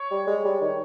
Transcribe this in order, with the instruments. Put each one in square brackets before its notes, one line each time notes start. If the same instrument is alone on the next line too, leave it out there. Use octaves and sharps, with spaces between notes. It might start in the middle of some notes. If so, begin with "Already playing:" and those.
Already playing: [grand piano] C#5
[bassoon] G3
G#3
G3
D#3